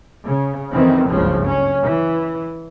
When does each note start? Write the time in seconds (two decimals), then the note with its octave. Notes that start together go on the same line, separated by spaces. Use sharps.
0.25 C#3
0.72 F2 D#3 E3 C4
1.10 F#1 C#2 G2 C#3 F3
1.47 C#4
1.84 E3